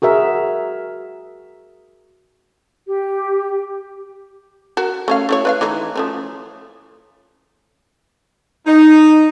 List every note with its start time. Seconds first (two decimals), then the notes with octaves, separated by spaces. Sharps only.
0.02 F#4 G#4 A#4 E5
2.88 G4
4.77 F#4 A#4
5.08 A3 C#4 F5
5.29 A3 E4 C#5
5.45 B4 D#5 F5
5.61 E3 A3 D#4
5.95 F3 A3 C#4
8.67 D#4